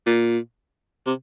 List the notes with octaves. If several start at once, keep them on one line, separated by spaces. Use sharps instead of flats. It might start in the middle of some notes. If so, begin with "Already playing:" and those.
A#2
C3